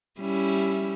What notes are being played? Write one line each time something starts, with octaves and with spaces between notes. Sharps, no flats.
G3 C#4 E4